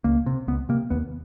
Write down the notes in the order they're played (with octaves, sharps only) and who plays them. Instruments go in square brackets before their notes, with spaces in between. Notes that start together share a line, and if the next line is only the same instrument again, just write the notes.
[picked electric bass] C#2 A#3
C3
C#2 B3
C3 A#3
D#2 B3